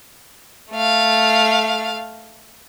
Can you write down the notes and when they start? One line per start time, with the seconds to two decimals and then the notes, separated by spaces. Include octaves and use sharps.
0.72 A3 F5